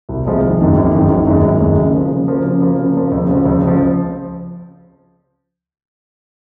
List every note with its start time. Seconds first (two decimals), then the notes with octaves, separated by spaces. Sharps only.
0.09 C2
0.25 C3 F3 G#3 C4
0.42 G#1
0.59 F#2 D#3 G#3
0.76 G#1
0.93 F#2 D#3 G#3
1.10 G#1
1.27 F#2 D#3 G#3
1.43 G#1
1.60 F#2 D#3 G#3
1.77 C#3
1.94 F3 A#3
2.11 C#3
2.28 F3 A#3
2.45 C#3
2.62 F3 A#3
2.78 C#3
2.96 F3 A#3
3.12 C#2
3.29 C#3 F3
3.45 C#2
3.63 C#3 F3